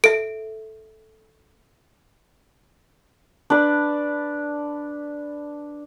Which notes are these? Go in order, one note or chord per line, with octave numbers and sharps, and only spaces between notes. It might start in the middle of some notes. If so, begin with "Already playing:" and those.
A4 E5 D7
D4 B4